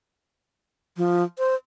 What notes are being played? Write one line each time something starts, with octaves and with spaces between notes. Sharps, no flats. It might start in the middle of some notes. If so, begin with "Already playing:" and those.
F3
C5